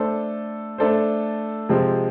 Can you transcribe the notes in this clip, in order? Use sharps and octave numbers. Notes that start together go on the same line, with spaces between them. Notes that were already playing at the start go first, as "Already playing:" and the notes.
Already playing: A3 D4 A4 C5
A3 D4 A4 C5
C3 F3 G#3 C4